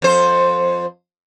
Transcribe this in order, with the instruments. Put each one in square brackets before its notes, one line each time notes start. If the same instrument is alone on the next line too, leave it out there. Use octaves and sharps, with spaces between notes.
[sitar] F2 C5